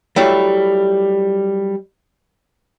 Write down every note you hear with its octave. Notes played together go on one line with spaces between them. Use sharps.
F#3 G3 A3 E4